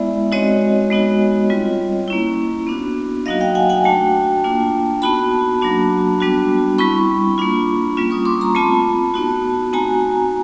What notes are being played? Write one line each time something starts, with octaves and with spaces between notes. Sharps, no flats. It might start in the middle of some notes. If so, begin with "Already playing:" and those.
Already playing: G#3 B3 E4 D5 E5
G#3 C4 D#4 F#4 C#5 D#5
G#3 B3 D#4 F#4
G3 C4 F4
A#3 C#4 E4
B3 D4 F#4
F#3 A#3 D#4 F#4 D#5 F5
F5 G5
F#5 G#5
F#5 G#5
A3 D4 F#4 G5 A5
A#3 D4 F4
B3 D#4 F#4 A5 B5
F#3 A#3 D4 F#4
G3 B3 D4 F#4
G3 C4 E4 B5 C#6
A#3 D4 F4
G3 A#3 C#4 F4
C#6 D#6
C6 D6
A#5 C6
A3 C4 F4 A5 B5
B3 D#4 F#4
A3 C4 D#4 F#4 G#5 A#5